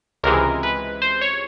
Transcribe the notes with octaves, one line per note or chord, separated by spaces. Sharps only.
C#2 C3 E3 G#3 A#4
B4
C5
C#5